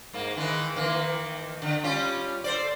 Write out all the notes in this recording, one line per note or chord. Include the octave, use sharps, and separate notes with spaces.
G#2 A#3
D#3 E3 G#3
D#3 E3 A#3
D3
G3 C#4 F4
A4 C5 D5